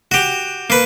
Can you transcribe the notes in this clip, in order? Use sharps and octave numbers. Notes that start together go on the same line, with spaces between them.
F#4 G4
A#3 B4